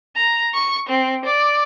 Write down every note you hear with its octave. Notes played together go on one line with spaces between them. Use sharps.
A#5
C#6
C4
D5